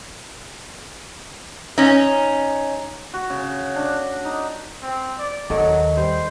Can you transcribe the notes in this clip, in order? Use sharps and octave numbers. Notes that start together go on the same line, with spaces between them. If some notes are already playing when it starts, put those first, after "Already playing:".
C#4 D#4
F#4
C#3
D4
D#4
C4
D5
D#2 D#3 F#3 A4
G3 C5